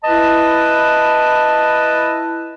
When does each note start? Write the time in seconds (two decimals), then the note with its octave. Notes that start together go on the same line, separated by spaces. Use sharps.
0.04 E4 B4 D#5 A5